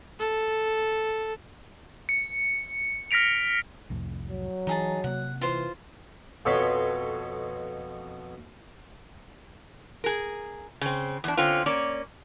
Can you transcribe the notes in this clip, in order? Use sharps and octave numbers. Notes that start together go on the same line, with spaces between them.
A4
C#7
F6 A#6 B6 D7 F7
C2 F2 A2
F#3
E3 D#4 G#4 A5
C3 A#3 F#5
E3 F4 C5
F2 B2 A4 B4 C#5 C6
G#4 A#4
C#3 C4
E2 D4
D3 C4 C#4 F4
A#3 C#4 D5